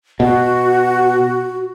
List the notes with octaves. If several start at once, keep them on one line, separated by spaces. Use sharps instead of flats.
B2 F#4